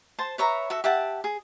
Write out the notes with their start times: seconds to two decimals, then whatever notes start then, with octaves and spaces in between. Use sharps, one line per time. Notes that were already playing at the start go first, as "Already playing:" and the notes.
0.19 C5 A5 C6
0.38 B4 C#5 E5 A#5
0.70 F#4 A4 E5
0.84 G4 E5 F#5 A5
1.24 G#4